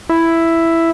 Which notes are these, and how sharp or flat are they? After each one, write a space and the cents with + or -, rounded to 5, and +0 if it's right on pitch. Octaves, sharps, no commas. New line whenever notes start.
E4 +5